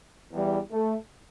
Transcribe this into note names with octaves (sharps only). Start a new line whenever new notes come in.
E2 E3 G3
A3